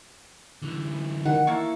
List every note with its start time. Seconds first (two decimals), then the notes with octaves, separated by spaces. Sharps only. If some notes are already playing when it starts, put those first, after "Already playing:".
0.62 D3 E3
1.26 D#3 F#5
1.47 A#3 E4 A4 C#6